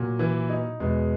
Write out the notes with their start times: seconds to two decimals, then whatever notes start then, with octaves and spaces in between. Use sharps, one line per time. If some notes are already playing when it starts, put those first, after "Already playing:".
Already playing: A#2 F#3
0.19 E3 E4
0.50 D#4
0.80 E2 B2 G#3